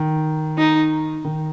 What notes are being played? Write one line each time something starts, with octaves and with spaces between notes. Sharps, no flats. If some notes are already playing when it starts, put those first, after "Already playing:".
Already playing: D#3
D#4
D#3